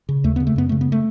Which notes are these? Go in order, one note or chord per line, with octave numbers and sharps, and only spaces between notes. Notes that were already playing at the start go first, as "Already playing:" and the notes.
C#3
D#2 A3
C#3 B3
A3
F#2 B3
C#3 A3
B3
A3